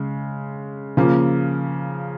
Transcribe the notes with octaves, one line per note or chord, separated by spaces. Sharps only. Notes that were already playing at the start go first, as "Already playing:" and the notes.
Already playing: C#3 G#3
C#3 F3 A#3